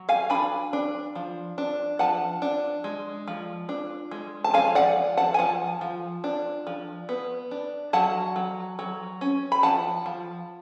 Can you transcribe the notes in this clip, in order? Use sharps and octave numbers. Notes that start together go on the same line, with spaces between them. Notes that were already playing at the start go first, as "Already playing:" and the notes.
Already playing: F#3
F5 G#5
D4 G#5 B5
D4
F3
D4
F3 F#5 A5
D4
G#3
F3
D4
G#3
A5
F3 F5 G#5
D5 F#5
F3
F#5 A5
G#5
F3 F#5 A5
F3
D4
F3
B3
D4
F#3 F#5 A5
F#3
F#3
C#4
B5
F3 F#5 A5
F3